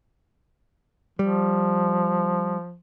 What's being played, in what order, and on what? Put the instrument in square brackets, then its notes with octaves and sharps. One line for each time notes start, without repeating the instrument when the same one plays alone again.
[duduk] F3 [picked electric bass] G3